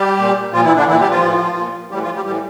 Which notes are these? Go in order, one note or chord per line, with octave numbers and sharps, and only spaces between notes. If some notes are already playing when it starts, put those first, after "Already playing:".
Already playing: G3 G4
A#2
A#2 F3 F4
E3 E4
D3 D4
A#2 E3 E4
G3 G4
F3 F4
A2 E3
A#2
A2 E3 G3 G4
F3 F4
G3 G4
A2 E3 G3 G4